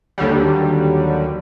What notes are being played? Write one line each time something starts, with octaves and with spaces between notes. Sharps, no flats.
D#2 D3 F#3 G3